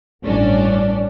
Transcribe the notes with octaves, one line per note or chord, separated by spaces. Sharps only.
A1 G2 C#4 D4 D5